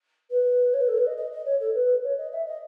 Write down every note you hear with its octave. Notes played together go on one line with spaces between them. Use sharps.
B4
C#5
B4
A4
B4
D#5
D#5
D#5
C#5
A4
B4
C#5
D#5
E5
D#5